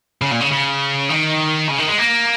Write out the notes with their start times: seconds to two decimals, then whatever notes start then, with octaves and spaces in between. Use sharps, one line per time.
0.22 C#3
0.31 A#2
0.41 C#3
0.52 C#3
1.10 D#3
1.69 C#3
1.78 D#3
1.88 G#3
1.98 A#3